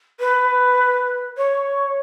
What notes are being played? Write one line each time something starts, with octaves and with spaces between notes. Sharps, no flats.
B4
C#5